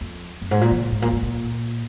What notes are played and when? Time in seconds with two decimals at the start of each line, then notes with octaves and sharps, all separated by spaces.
0.01 F2
0.42 F#2
0.51 G#2
0.61 A#2
0.71 F3
0.81 A#2
0.92 G#2
1.02 A#2
1.13 G#2
1.23 A#2